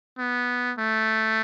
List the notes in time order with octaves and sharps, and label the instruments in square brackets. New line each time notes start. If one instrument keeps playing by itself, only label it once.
[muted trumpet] B3
A3